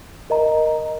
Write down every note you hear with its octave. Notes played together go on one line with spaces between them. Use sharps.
A#4 D#5 A#5